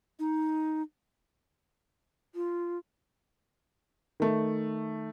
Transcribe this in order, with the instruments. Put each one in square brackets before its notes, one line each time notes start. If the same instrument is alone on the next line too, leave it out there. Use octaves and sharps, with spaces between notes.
[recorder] D#4
[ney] F4
[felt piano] D#3 A3